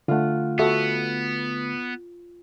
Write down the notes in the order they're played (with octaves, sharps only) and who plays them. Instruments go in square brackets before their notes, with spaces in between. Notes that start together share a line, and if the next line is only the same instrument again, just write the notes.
[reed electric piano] D3 A3 [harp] F4 F#5
[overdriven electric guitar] B3 [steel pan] F#4 A4 E5